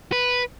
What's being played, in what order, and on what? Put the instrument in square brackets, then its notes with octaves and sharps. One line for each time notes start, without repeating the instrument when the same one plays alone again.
[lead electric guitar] B4